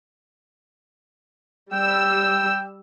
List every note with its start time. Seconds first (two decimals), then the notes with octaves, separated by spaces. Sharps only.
1.72 G3 G5 E6